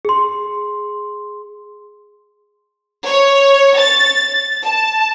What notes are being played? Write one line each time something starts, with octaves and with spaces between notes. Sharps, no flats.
G#4 C6
C#5
A6
A5